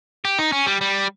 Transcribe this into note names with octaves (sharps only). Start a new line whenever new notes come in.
G4
D#4
C#4
G3
G3